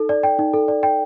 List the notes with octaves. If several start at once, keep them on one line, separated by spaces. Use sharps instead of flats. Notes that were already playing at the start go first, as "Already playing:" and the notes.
Already playing: D#4 A4
D5
G5
D#4
A4
D5
G5